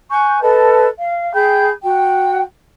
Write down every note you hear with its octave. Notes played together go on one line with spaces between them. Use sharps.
G#5 C#6 F#6 G6
A4 B4 D#5 A5
F5
G#4 G5 B5 G6
F#4 G5